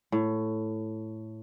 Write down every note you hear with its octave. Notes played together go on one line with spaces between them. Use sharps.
A2